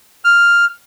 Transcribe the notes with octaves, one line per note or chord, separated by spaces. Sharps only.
F6